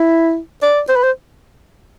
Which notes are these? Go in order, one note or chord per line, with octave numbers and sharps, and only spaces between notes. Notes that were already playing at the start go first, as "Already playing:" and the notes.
Already playing: E4
D5
C5
B4
C5